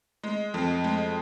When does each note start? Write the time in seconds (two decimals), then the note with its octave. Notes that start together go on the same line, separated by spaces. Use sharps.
0.23 G#3
0.54 F2
0.84 G#3